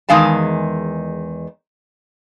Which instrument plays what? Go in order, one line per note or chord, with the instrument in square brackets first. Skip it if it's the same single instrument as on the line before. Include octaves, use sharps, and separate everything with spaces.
[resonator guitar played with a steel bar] E2 D#3 G#3 F5 G#5 A5